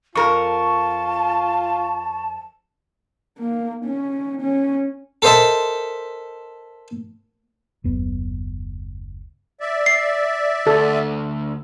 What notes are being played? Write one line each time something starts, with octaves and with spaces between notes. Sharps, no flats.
F2 F4 A#4 A5 C#6
A#3
C#4
C#4
A4 A#4 C5 D#5 E5 A5
F#1 D#2 B3
D5 E5
C7
D2 A4